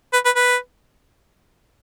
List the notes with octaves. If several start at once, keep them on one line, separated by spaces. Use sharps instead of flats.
B4
B4
B4